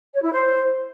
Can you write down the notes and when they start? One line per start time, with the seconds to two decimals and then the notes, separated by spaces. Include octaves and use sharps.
0.14 C#5
0.23 E4
0.32 C5